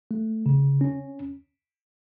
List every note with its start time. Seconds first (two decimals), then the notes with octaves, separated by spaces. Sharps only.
0.11 A3
0.46 C#3
0.81 C#4